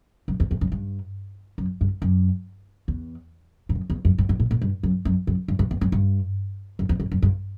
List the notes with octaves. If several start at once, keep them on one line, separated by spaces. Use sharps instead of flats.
F#2
E2
E2
F#2
G2
F#2
G2
F#2
E2
G2
F#2
E2
F#2
G2
G2
A2
A2
G2
F#2
F#2
F#2
G2
G2
E2
F#2
G2
F#2
E2
F#2
F#2
G2